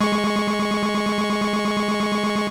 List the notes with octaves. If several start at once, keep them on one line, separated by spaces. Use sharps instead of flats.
G#3 C#6